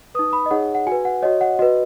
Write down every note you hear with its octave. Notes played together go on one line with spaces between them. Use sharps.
D#4 B4 D#6
B5
D#5
D#4 G#4 C#5 F#5
F#5
F#4 B4 G#5
F#5
F#4 C#5 D#5
F#5
F#4 B4 D#5